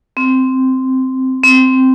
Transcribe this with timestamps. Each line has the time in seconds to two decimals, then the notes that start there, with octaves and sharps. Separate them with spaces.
0.17 C4
1.44 C4